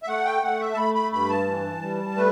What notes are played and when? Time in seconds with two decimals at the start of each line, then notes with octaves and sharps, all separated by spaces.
0.03 E5
0.08 A3 F#5
0.25 G5
0.42 A3 F#5
0.60 E5
0.73 A5
0.77 A3 B5
0.95 B5
1.12 G2 B5
1.30 A5
1.47 E3
1.82 G3
2.16 A3 B4